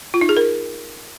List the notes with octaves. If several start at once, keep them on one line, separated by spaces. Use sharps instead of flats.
F4
D#4
G#4
A#4